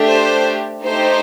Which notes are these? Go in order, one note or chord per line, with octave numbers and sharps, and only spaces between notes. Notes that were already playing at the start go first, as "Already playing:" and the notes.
Already playing: A3 D4 G4
C5
A3 D#4 G4 C5